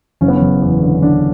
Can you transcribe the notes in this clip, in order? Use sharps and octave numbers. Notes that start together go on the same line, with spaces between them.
F#1 C#4
B3
C#4
F#1
E2
D3
D3 D4